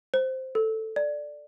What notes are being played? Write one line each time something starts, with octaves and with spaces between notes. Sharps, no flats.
C5
A4
D5